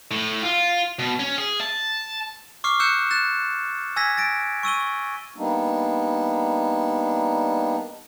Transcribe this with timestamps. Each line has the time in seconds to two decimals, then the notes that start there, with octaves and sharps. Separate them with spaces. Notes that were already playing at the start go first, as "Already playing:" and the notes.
0.11 A2
0.43 F4
0.99 B2
1.19 C#4
1.38 G#4
1.61 A5
2.64 C#6 D6 F6 C7
2.80 E6 F#6 G6 C#7 E7
3.11 F#6 A6 E7
3.96 G#5 E6 G#6 A#6 B6
4.17 A6 A#6 D7
4.63 C#6 E6 D#7 G7
5.37 G3 A#3 B3 D4 D#4